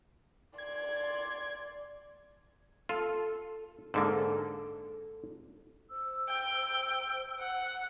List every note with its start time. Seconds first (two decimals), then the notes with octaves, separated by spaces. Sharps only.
0.58 D5 C6 G#6
2.89 F4 A4
3.94 G#2 D3 A#3 A4
5.91 C5 E6
6.29 G5
7.40 F#5